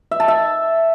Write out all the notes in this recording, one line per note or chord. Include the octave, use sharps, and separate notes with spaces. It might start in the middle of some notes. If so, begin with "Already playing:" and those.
E5
A5
E5